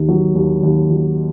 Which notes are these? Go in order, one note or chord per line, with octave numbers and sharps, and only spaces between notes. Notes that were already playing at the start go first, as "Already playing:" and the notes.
Already playing: D#2 D#3
F#3
D#2
D#2
F#3